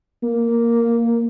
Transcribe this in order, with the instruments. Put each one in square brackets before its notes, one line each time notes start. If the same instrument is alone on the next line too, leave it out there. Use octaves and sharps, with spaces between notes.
[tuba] A#3